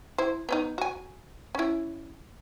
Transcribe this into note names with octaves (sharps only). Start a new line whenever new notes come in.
E4 C5
B3 C#4 D#4
F#4 G#5
C#4 E4